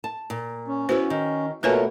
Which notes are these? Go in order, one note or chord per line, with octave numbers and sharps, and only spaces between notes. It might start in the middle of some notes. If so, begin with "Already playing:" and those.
A5
A#2
C#4
B3 E4 F#4 B4 C5
D#3
B2 A3 A#3 F4 A#4 B4 C#5 G#5